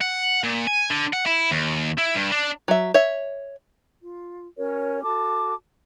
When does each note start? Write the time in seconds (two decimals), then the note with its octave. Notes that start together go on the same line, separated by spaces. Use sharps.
0.01 F#5
0.44 A#2
0.67 G#5
0.90 D3
1.13 F#5
1.26 E4
1.51 D#2
1.98 E4
2.15 G2
2.31 D4
2.68 F#3 E5
2.94 C#5 E5
4.01 F4
4.57 C#4 F#4 A#4 C#5
5.03 F#4 A4 A5 D6